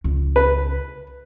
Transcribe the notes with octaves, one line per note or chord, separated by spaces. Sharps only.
C#2
B4